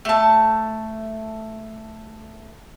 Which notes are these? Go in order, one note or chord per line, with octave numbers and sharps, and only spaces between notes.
A3 A5